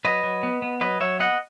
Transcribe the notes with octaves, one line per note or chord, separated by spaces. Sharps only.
F#3 B4 D#5
F#3
B3
B3
F#3 B4 D#5
F#3 C#5 E5
B3 D#5 F#5